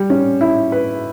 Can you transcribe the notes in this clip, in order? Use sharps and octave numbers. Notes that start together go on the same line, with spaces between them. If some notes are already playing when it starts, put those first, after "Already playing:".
Already playing: G3
C#4
E4
B4